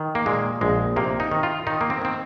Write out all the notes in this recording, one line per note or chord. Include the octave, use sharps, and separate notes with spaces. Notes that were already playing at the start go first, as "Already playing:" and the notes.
Already playing: D#3
A#3
A#2 G#3
A#1 G#3
C3 A#3
D#4
D#3
F4
D#3 D#4
A#3
C4
D#3 C4